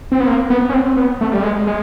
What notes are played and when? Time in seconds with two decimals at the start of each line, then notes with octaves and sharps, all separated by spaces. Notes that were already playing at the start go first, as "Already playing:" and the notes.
0.12 C4
0.20 B3
0.27 A#3
0.50 B3
0.69 C#4
0.73 C4
0.97 B3
1.21 A3
1.32 G3
1.43 G#3
1.67 G#3